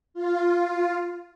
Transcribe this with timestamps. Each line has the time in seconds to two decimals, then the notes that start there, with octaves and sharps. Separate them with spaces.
0.14 F4